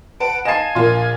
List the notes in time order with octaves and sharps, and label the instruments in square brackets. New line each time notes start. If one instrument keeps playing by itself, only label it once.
[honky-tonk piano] B4 F#5 A5 [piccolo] D7
[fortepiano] D#5 F5 A5 [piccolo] G#5 [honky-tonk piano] C7 E7
[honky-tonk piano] A#1 F4 [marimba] A#4 C6